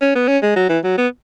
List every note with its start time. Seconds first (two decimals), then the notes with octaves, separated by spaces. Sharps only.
0.01 C#4
0.15 B3
0.28 C#4
0.43 G#3
0.56 F#3
0.69 E3
0.84 F#3
0.98 B3